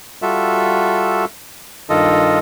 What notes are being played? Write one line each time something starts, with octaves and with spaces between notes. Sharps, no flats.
G3 F4 F#4 A4 E5
G2 D#3 F4 A4 D#5